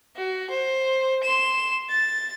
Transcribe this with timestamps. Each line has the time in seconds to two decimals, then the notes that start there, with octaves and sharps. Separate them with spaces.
0.16 F#4
0.50 C5
1.23 C6 E7
1.90 A6